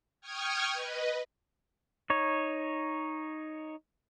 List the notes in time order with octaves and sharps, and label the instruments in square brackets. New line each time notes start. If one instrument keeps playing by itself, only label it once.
[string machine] G5 C#6 D#6 F6 G#6
B4 D#5
[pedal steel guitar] D#4 C#5